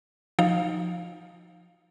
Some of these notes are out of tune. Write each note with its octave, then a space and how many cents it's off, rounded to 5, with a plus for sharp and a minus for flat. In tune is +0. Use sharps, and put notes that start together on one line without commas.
F3 +10 D#4 +0 F5 +0